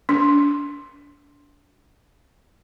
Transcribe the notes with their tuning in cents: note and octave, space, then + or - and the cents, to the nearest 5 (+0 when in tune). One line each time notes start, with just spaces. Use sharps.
D4 -30